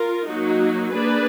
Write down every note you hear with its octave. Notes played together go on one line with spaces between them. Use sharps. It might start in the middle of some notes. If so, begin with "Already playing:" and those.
Already playing: F4 A#4
F#3 A#3 D#4 F#4
A#3 D4 G#4 B4 D5